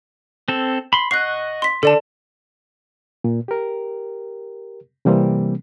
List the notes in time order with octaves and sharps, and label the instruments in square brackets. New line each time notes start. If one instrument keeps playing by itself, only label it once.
[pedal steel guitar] C4 A4
B5 C6
[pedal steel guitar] D#5 F#5 C#6 [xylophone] F#6 C7
[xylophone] C6 B6
[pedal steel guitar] D3 [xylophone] A4 D5 A5
[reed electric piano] A#2
G4 A#4
C3 E3 G3 A#3 C4